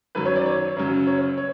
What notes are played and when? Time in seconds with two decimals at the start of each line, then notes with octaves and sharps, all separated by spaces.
0.15 F#2 D#3 F#3 B4
0.25 C#5
0.36 D5
0.46 C#5
0.76 F#2 C#3 F#3
1.07 C#5
1.37 C#5